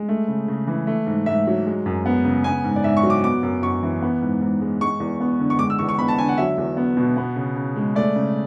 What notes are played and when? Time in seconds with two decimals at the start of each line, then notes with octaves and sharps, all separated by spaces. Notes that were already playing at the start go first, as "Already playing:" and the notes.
Already playing: G#3
0.09 A3
0.28 C#3
0.48 C#3
0.67 E3
0.87 A3
1.07 G#2
1.26 G#2 E5
1.47 F#3
1.66 G#3
1.86 F#2
2.06 B3
2.25 C#3
2.44 B3 G#5
2.64 G#2
2.76 D5
2.84 G#2 E5
2.97 C#6
3.03 F#3
3.10 D6
3.24 B3 D6
3.43 F#2
3.62 F#2 C#6
3.83 E3
4.02 B3
4.22 G#2
4.41 G#2
4.61 G#3
4.81 G#3 C#6
5.00 E2
5.20 B3
5.40 D3
5.50 C#6
5.59 G#3 D6
5.70 E6
5.79 E2 C#6
5.89 C#6
5.98 B3 B5
6.08 A5
6.18 D3 G#5
6.29 F#5
6.38 F#3 E5
6.58 E2
6.77 B3
6.97 B2
7.17 B3
7.36 C#3
7.56 C#3
7.76 G#3
7.95 A3 D5
8.16 C#3